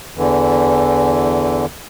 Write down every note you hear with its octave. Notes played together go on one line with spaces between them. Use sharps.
E2 D3 E3